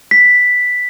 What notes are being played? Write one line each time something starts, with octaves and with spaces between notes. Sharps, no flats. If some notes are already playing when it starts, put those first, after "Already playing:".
B6